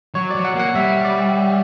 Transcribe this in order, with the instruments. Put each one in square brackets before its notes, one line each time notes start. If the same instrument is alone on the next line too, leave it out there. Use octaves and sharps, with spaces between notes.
[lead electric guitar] F#3 [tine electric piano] C#5
[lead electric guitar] F#3 [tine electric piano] D5
[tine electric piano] F#5
[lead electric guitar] A#3 [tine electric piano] F#5
[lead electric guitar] G3 [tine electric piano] E5
[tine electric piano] D5